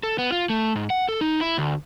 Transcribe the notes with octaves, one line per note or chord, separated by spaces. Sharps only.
A4
B3
F4
A3
G#2
F#5
A4
D#4
E4
D2